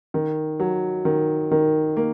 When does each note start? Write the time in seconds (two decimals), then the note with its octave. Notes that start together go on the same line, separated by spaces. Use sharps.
0.14 D#3
0.60 F#3
1.05 D#3
1.51 D#3
1.97 A#3